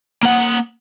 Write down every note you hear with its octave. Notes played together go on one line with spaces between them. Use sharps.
A#3 F#5